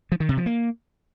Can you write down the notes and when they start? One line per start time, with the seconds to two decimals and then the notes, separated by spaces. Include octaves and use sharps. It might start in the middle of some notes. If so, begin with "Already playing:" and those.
0.12 F3
0.20 D#3
0.29 C3
0.37 F3
0.46 A#3